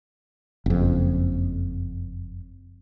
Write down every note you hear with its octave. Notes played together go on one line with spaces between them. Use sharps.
F#1 F2